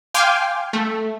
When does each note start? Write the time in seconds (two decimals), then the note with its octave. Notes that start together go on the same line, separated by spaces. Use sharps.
0.14 F5 G5 G#5 C6 D6 F6
0.73 A3